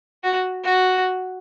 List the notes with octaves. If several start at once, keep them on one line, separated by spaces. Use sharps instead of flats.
F#4
F#4